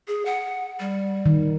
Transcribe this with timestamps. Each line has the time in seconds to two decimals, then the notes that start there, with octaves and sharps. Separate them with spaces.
0.08 G#4
0.25 F#5
0.80 G3
1.26 D#3